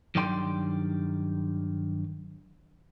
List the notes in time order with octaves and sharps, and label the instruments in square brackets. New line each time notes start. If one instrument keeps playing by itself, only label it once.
[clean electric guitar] G2 D#3 F#3 D5 G5 C6